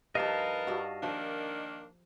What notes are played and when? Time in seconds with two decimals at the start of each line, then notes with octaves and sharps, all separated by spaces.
0.15 G2 F3 D#4 A#4 B4 D#5 F5 A5
0.67 G2 F#4
1.03 D#3 F3 A#3 D4